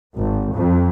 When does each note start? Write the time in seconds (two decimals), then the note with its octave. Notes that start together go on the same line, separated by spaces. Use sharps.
0.16 G#1
0.54 F2